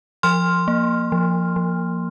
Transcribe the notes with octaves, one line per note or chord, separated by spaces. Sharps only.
F3 C6 F6
A#3
F3
F3